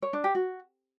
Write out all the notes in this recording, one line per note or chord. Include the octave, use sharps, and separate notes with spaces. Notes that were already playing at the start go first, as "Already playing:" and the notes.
C#5
D4
G4
F#4